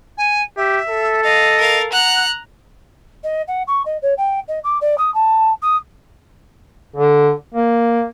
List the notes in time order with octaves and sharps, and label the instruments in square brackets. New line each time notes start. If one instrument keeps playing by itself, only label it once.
[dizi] G#5
[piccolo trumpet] G4 [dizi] E5
[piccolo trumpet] A4
[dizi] D#5 [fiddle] F5
[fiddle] A#4 F5
[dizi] F#5 [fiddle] A#5 F#6
[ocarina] D#5
F#5
C#6
D#5
C#5
G5
D#5
D6
D5
D#6
A5
D#6
[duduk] D3
A#3